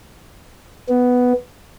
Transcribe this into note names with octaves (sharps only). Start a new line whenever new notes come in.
B3